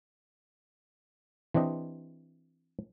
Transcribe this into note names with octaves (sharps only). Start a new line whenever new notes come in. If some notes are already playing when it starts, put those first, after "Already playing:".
E3 C4 D4 G4 D#5